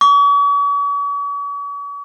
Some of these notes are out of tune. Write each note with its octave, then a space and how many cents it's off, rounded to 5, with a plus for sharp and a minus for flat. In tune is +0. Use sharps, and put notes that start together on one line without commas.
C#6 +45